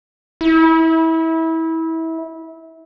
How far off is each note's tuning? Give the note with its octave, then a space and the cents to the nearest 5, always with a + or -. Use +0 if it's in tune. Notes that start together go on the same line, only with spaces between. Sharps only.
E4 -25